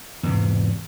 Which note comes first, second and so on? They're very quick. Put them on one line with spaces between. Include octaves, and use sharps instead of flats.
E2 C3 G#2